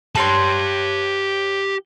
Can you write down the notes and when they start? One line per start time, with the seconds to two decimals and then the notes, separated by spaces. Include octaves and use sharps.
0.15 G4 B4 C#5 A5 C6